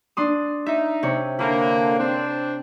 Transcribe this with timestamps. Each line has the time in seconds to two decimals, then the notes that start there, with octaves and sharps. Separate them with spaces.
0.17 D4 C6 D#6
0.66 D#4 E5
1.03 C3 C#5
1.39 D3 A#3 E4
1.99 C4 D4